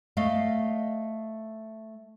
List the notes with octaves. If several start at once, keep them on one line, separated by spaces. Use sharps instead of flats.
A3 D#5 F5